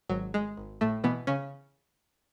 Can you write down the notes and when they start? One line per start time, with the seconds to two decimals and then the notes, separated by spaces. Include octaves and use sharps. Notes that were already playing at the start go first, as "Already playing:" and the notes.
0.09 G#1 F#3
0.34 G#3
0.57 G#1
0.81 A2 A3
1.04 B2 E3 B3
1.27 C#3 C#4